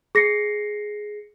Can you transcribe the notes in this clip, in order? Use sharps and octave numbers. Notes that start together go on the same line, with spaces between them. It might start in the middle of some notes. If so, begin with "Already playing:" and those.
G#4 A#6 C7 C#7